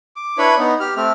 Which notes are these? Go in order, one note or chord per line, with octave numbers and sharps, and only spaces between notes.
D6
D4 E4 B4 C#5 B5
B3 D#4
G4 F6
A3 C4 F6